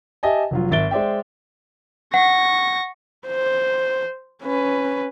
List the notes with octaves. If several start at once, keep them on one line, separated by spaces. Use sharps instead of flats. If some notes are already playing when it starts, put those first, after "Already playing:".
G4 D#5 E5 G#5 A5
F1 F#3 F4
G#1 E5 A6 D7 G7
G#3 C5 D5 E5 G5
F#5 C#6 A#6
C5
C#4 B4